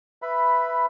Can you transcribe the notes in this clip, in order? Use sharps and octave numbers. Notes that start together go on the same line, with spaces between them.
B4 E5 B5